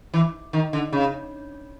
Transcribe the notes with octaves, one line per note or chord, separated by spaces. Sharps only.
E3
D#3
D3
C#3